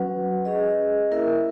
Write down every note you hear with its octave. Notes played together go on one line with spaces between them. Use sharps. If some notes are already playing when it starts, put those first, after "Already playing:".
Already playing: F#3 C#4 F#4 B4 F#5
C#4 G#4 D#5
A#3 E4 A#4 E5